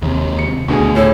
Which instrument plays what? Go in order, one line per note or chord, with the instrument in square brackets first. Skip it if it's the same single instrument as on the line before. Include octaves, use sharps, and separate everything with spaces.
[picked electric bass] D#2 C3
[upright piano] C#7
[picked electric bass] D2 [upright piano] B2 D3 G#4
[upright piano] A2 E6 [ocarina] C#5